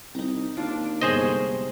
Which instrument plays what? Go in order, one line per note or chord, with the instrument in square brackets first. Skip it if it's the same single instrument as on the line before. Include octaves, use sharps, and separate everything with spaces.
[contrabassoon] C2 [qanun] D#4 A#5
[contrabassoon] D#2 [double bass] D4 [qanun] F4
[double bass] G1 [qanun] C3 G#3 C#5 [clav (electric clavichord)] G#4 C5 D#5